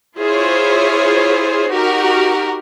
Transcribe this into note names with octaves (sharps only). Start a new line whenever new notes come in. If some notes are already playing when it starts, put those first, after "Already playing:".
E4 F4 G#4 C5 C#5
D#4 F#4 G4 A#4